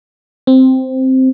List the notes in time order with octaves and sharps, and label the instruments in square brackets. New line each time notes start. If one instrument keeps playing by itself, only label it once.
[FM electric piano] C4